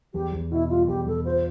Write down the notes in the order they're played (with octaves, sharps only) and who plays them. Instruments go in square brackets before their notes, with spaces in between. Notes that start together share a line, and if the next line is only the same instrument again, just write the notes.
[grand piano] E2 [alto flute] G4
[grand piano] E2
[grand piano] B2 [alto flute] E4
[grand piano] G3 [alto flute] F4
[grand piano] E2 [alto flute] G4
[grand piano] E2 [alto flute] A4
[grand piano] F4 [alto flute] C5